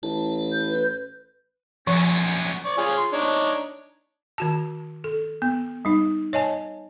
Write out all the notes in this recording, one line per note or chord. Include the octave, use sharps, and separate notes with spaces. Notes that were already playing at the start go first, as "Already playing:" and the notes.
A1 E4 A5
B4 G6
F#2 A#2 F3 B3 C4 C#5
D5 C#6
F4 G#4 C#5
C6
D4 D#4 C#5
D#3 F#4 A5
A4
B3
G3 D#4
C#5 D#5 G#5 A5